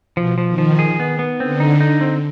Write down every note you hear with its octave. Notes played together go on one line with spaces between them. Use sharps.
B2 F3
F3
D#3
F3
G#4
B3
B3
D3 C4
D#4
D#4
C4